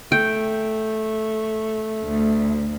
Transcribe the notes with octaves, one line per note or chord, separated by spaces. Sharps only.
A3 G5
D2